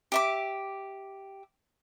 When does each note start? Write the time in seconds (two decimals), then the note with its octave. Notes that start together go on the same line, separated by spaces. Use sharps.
0.12 G4 E5 D6